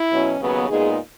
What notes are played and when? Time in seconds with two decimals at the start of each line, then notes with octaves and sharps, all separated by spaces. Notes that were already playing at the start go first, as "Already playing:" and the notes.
Already playing: E4
0.11 B2 F#3 C#4
0.40 D#2 C#3 F#3 B3
0.68 A#2 G#3 B3 D#4 G#4